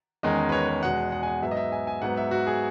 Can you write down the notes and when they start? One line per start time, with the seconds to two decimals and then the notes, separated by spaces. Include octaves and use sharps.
0.23 E2 D#3 G#3 C#4 D#5
0.49 B4
0.52 C#5
0.68 B4
0.82 E2 B2 G#3 F#5
1.12 F#5
1.23 G#5
1.28 F#5
1.42 G#2 F#3 B3 E5
1.51 D#5
1.57 E5
1.72 G#5
1.87 G#5
2.02 G#2 F#3 B3 F#5
2.17 E5
2.31 F#4
2.47 G#4